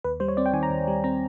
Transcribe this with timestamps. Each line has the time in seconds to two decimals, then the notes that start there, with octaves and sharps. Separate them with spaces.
0.04 D#2 B4
0.20 G3 C5
0.28 C#5
0.37 C4 D5
0.46 G5
0.53 D#3 G#5
0.63 A#5
0.70 D#2
0.88 G3
1.04 C4 A#5